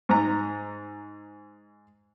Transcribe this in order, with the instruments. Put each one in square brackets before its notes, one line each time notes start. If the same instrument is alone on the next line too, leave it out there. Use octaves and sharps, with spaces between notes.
[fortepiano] G#2 A#5